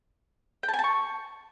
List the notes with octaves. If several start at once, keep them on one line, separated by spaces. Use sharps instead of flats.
G5
A5
G#5
A5
C#6